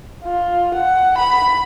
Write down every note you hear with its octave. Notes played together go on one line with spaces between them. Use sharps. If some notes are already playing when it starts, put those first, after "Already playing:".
F4
F#5
B5